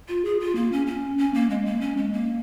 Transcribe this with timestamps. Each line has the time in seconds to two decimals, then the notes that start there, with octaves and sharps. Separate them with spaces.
0.08 F4
0.25 G#4
0.40 F4
0.55 A#3
0.72 C#4
0.87 C#4
1.18 C#4
1.34 A#3
1.50 G#3
1.65 A#3
1.81 C#4
1.97 G#3
2.13 A#3